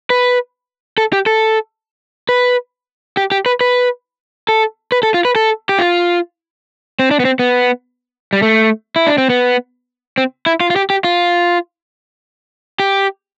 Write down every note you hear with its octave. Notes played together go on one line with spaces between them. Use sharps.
B4
A4
G4
A4
B4
G4
G4
B4
B4
A4
B4
A4
F4
B4
A4
G4
F4
C4
D4
B3
C4
B3
G3
A3
E4
D4
C4
B3
C4
E4
F4
F4
G4
G4
F4
G4